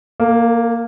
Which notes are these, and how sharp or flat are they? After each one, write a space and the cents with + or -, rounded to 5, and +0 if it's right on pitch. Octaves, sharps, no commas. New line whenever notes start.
A#3 +0 A4 +45